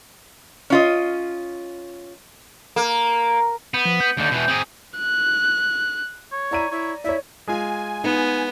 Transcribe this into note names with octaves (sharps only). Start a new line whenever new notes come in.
C#4 F4 D#5
A#3
B3 G6
F3
G6
D#2 D3
B2 E3
C4 G#4
F#6
C#5
E4 D5 A#5 D#7
E4 C#5
E4 C#5 D5 E5
G#3 F4 G#5
B3 D#4